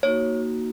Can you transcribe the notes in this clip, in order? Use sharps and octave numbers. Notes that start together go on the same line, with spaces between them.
A#3 D#4 F#4 C#5